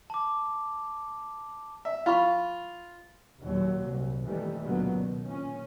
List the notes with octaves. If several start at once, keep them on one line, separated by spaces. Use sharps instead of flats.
A5 D6
E5
F4 F5 B5 C#6
A#1 D#2 A#2 F#3
C2
A#1 F2 D#3 E3 G3 A3
C#2 F#2 A#2 D3 F#3 B3
B2 D#3
A#2 C#4